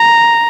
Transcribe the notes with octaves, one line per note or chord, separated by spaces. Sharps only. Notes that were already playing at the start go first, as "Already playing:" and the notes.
Already playing: A#5